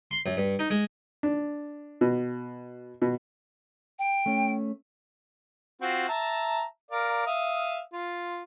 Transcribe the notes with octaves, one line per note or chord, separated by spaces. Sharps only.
C6
F#2
G2
D#4
G#3
D4
B2
B2
G5
A3 C#4
C4 F4 F#4
E5 A5 A#5
A#4 D5 F5
E5 F5 D#6
F4